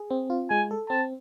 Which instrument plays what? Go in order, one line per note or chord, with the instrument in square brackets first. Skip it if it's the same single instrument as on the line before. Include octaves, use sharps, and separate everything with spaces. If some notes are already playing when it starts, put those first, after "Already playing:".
Already playing: [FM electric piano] G#4
C4
F4
[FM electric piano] G#3 [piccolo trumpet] G#5
[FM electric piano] A4
[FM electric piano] C4 [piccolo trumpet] A5